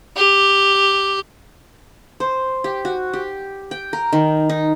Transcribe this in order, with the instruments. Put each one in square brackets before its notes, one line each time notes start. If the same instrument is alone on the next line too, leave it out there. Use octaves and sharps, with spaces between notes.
[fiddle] G4
[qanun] C5
G4
F#4
G4
G5
A#4
D#3
D#4